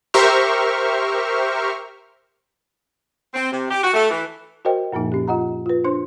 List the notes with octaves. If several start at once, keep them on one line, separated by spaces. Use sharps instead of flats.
G4 A#4 C5 E5 C#6 F6
C4
C3
G4
F#4
A3
E3
F#4 A#4 C5 D#5 G5
F#2 A#2 F3 A#3 D#4
C#4 G4
F4 D#5 F#5 A#5
F4 B4
D4 C5 C6